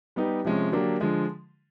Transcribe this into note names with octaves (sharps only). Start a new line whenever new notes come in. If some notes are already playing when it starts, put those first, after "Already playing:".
G3 B3 D#4 G4
C3 F3 G#3 C#4
D3 F#3 A#3 D4 G4
D3 F3 G#3